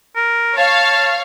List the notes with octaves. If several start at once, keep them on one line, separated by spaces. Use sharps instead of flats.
A#4
C#5 F5 A5